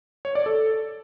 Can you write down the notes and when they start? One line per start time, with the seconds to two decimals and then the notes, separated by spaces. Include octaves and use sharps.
0.25 C#5
0.35 D5
0.46 A4